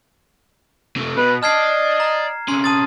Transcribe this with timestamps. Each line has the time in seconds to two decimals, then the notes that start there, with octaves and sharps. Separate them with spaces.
0.96 C3 A3
1.17 B2 B4
1.43 D5 D#5 A5 F6 G#6 C7
2.00 A#5
2.48 C3 C#4 C6
2.64 A5 D#6 A6